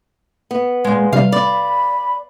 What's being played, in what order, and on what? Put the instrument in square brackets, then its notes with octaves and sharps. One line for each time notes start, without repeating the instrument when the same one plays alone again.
[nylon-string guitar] B3
[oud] A#2 G#3
[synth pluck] C3 G3 [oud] F5
[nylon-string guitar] D5 [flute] B5